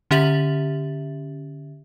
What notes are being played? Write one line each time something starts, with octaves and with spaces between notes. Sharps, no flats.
D3 C#4 G4 E5 A6 F#7